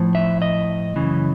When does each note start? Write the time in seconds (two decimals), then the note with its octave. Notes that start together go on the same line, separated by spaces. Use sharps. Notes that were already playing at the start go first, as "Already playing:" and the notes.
Already playing: A2 F3
0.15 E5
0.42 D#5
0.96 F#2 C#3 E3